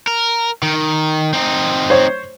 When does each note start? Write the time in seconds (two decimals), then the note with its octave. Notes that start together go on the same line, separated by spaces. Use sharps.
0.07 A#4
0.63 D#3
1.33 C4 D#4
1.90 C5 C#5